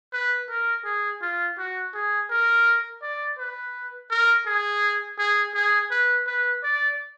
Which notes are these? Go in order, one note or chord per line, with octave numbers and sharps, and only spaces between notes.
B4
A#4
G#4
F4
F#4
G#4
A#4
D5
B4
A#4
G#4
G#4
G#4
B4
B4
D5